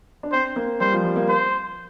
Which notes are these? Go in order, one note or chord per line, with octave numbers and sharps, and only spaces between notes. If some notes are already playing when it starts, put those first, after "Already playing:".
D4
C4 C5
A#3
G3 C5
F3
G3
A#3
C5